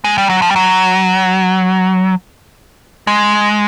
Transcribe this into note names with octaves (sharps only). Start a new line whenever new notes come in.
G#3
G3
F#3
F3
G3
F#3
G#3